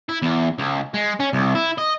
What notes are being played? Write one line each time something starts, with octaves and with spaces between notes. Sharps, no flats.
E4
E2
C#2
G#3
C#4
C2
E4
D#5